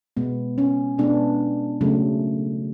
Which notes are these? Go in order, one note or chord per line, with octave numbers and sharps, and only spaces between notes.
B2 G#3 B3
C#4
B2 G#3 B3 D4
C#3 F#3 A3